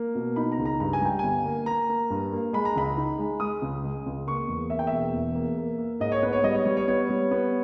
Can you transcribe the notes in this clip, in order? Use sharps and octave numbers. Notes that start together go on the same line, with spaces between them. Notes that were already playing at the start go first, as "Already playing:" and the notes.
Already playing: A#3
B2
D#4 B5
A#5
C#2
A#5
G2 A#5
G#5
G3 G5
G1 G#5
A#3
A#3 A#5
A#3
G2
A#3
G#3 B5
A#5
C#2 B5
D#4
G#3
G#3 D#6
C#2
G#3
C#2
A#3 C#6
E2
A#3 E5
G5
E1 E5
E2
A#3
A#3
A#3
G#2 D#5
C#5
B3 B4
C#5
G3 D#5
C#5
G3 C#5
C#5
B3 C#5
G3
B3